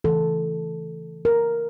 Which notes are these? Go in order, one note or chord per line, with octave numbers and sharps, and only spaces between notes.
C#3 E3 A3 A4
A#4